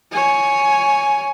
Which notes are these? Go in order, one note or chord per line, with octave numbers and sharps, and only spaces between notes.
C#5 G#5